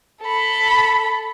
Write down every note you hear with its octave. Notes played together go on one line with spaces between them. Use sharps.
A4 B5